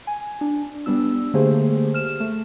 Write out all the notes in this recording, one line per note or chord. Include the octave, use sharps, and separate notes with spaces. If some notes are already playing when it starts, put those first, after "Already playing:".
G#5
D4
G3 B3 D4 E6
D3 A3 A#3 G4 G#4 C5
F6 E7
A3